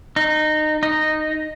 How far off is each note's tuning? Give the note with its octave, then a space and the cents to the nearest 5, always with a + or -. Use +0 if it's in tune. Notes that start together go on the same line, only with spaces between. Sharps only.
D#4 -20
D#4 -10